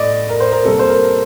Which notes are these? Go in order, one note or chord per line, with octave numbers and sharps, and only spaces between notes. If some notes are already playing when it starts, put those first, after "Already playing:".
Already playing: A2 A3 D5 D#5
A#4
C5
A#4
C3 G3 A#3 A4
C5
A#4